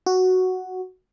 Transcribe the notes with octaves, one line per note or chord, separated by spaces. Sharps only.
F#4